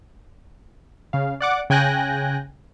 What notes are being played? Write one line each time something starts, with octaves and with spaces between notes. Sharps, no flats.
C#3 F5
D5 F#5 D6
C#3 G5 G#5 F#6 G6 A#6